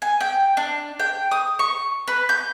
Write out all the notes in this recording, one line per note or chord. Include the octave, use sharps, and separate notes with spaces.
G#5
G5
D4
G5
D#6
C#6
B4
G6